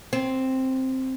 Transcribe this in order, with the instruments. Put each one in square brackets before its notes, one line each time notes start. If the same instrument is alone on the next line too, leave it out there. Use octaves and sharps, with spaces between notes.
[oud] C4